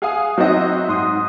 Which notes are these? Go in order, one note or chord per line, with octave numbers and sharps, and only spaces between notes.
G#4 F5 F#5 G#5 D#6
F#3 C4 D#4 F#4 D#5 E5
G#2 C6 D#6